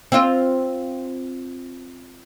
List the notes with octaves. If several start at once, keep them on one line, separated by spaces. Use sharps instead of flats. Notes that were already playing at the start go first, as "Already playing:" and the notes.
C4 F4